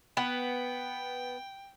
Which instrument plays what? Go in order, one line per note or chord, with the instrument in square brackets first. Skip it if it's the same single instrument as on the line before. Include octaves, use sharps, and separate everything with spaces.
[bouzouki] B3 [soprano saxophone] G5